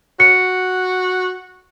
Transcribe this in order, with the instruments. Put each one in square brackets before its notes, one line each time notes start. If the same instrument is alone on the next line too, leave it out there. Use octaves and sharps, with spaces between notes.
[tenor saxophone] F#4 [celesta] C#7